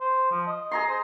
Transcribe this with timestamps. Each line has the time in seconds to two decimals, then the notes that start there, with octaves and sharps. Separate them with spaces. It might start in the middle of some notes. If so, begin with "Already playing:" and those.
0.01 C5
0.31 F3
0.47 D#5
0.71 G#4 A#5 C6
0.88 C5